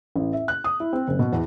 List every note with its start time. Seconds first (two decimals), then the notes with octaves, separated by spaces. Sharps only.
0.16 A1
0.33 E5
0.48 F#6
0.64 D#6
0.80 E4
0.93 C4
1.08 F#1
1.19 B2
1.32 E2